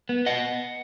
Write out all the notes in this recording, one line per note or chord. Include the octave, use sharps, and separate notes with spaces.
B3
D#5 F#5